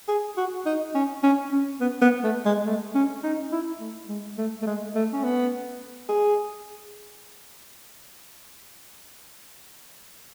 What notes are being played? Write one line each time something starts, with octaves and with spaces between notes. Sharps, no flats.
G#4
F#4
D#4
C#4
C#4
C#4
B3
B3
A3
G#3
A3
C#4
D#4
E4
A3
G#3
A3
A3
G#3
A3
C#4
B3
G#4